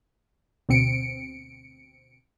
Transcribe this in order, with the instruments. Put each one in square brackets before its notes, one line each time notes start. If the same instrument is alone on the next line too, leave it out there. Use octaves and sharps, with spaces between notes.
[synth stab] D2 B2 C4 C#7 D7